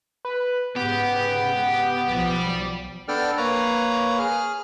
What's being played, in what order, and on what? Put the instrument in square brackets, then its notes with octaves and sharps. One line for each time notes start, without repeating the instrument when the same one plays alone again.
[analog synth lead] B4
[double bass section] G#2 C#3 [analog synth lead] B3 [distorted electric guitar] G4
[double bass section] B1 F3 [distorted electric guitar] G4 D5
[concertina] B3 D4 A4 D5 G5 F6
A#3 B4 C#5 A#5
G#4 F6